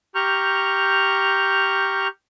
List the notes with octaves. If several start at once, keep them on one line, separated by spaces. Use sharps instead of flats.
G4 A#5 C#6 F6 G6